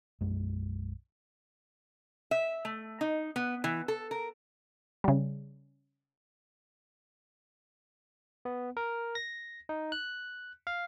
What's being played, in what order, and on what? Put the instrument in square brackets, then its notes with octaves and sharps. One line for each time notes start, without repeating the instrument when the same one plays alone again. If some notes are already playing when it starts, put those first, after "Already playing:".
[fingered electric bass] B1 F#2 G#3
[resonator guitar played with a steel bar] E5
A3
D#4
B3
E3
A4
A#4
[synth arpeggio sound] C#3 G3
[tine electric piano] B3
A#4
A#6
D#4
F#6
F5